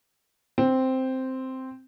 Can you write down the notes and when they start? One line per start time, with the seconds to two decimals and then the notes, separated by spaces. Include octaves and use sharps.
0.58 C4